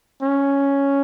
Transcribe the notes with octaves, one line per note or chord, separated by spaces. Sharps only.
C#4